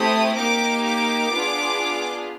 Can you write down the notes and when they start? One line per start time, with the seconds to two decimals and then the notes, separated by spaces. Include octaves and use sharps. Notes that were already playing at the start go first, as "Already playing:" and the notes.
Already playing: A3 C4 E4 G4 D#6
0.37 A#3 D#4 G4 D6
0.84 D6
1.32 B3 D4 F4 G#4